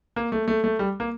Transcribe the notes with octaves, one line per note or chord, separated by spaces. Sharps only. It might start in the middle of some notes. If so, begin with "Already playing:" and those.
A#3
A3
A3
A3
G3
A#3